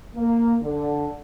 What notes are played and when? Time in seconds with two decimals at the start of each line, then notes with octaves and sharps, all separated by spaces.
0.16 A#3
0.62 D3